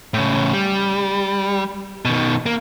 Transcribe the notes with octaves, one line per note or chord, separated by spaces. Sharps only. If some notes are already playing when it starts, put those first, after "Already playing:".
A2 C#3
G3
B2 D#3
A#3